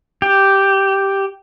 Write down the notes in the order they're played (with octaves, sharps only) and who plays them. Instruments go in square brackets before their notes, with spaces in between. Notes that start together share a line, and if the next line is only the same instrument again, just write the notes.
[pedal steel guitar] G4